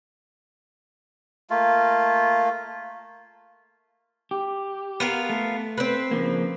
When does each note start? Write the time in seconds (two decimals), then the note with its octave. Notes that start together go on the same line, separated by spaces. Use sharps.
1.50 A3 A#3 F4
4.31 G4
5.00 B3 F4 A#4
5.30 A3
5.78 C4 B4
6.11 C#3 F3 A#3